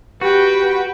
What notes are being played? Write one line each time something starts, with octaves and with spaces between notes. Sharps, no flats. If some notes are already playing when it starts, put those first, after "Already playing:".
F#4 G4 B4 G5